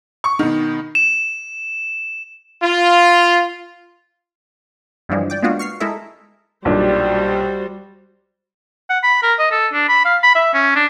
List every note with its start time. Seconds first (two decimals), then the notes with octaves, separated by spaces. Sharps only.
0.24 C#6
0.39 B2 D#3
0.95 E7
2.62 F4
5.09 G2 D3 E3 F3 G3 G#3
5.30 D5 G5 D6
5.43 G#3 A#3 B3 D4 F4 F#4
5.59 C#6 F6 C7
5.80 G#3 E4 A4 A#4 D#5 E5
6.65 B1 A#2 G3 D4 F#4 C5
8.90 F#5
9.03 B5
9.23 A#4
9.39 D#5
9.51 A4
9.73 D4
9.89 B5
10.05 F5
10.23 B5
10.35 E5
10.54 C#4
10.75 D4